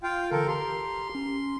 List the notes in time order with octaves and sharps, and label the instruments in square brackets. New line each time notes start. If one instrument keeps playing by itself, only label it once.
[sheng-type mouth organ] F4 F5 G5
[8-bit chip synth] D3 E3 [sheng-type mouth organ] A4 A#4
[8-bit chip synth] G4 A#5 [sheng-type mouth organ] C6
[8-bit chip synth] C#4